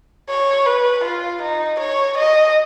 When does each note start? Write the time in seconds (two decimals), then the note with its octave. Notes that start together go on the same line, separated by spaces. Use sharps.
0.29 C#5
0.66 B4
1.04 F4
1.42 D#4
1.80 C#5
2.18 D#5